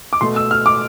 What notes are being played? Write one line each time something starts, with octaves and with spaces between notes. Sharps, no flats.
D6
B2 A3 C6
E6
F6
D6